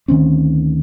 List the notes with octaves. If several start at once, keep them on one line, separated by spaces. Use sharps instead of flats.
D2 D#3 C4 C#4